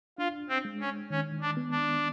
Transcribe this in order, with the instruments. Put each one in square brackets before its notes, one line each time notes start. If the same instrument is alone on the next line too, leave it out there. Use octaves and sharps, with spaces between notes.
[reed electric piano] D4 [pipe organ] F4
[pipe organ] C4
[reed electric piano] G#3
[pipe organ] C#4
[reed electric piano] D#3 [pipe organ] C#4
[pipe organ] D4
[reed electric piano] B3
[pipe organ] D4